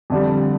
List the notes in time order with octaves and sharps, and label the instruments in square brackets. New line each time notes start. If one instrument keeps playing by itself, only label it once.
[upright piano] F2 D3 G3